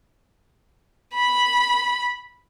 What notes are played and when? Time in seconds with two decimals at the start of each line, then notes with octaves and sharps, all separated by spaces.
1.14 B5